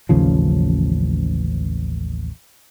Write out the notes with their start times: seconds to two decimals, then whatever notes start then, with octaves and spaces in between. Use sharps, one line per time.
0.09 A1 D#2 C#3 F3